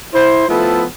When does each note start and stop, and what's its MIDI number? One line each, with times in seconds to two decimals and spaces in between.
0.14 0.47 64
0.14 0.47 72
0.48 0.84 53
0.48 0.84 57
0.48 0.84 59
0.48 0.84 64
0.48 0.84 69